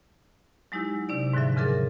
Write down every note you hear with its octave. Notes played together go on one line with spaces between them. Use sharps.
F#3 G#3 D#4 E4 G4
C3 D4 D5
G#2 D3 F3 F#3 E5
E2 C#3 G#4 A#4 D6 A6